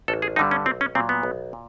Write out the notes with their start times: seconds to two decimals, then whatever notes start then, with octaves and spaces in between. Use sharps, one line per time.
0.08 A1 A4
0.22 G#4
0.36 G2 D3 G3 D#4
0.51 C#4
0.66 B1 C4
0.81 C#4
0.95 A#2 F#3 C4
1.09 B3
1.23 B1
1.53 A#2